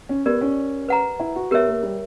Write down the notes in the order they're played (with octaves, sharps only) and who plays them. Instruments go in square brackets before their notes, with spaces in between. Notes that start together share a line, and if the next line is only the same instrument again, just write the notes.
[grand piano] C#4
[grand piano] B3 [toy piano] G4 A#4 D5
[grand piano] C#4
[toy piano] B4 F#5 A#5
[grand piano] E4
F#4
[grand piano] B3 [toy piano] G4 A#4 C#5 E5
[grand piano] A#3
G3